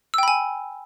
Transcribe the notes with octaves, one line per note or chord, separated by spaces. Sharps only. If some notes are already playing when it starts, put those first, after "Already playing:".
G5 G#5 B5 E6